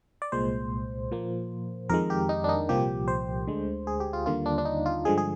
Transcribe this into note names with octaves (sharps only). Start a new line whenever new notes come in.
D5
C2 A#2 G#3 C5
A#2 F3 A#3
F2 D#3 G#3 A#4
G4
D#4
D4
D#4
C2 A#2 F3 A#3 G4
C5
D2 D3 G#3
G#4
G4
F4
D#2 D3 G3 A#3 F4
D4
D4
D#4
F4
G2 D3 F3 G#3 G#4
G#4